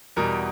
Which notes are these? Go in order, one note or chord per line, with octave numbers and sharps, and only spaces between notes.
E2 B2 G3 A#4